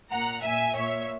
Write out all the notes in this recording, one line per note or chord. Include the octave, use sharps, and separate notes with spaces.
A#2 F#5 A#5
A#2 E5 G#5
A#2 C#5 E5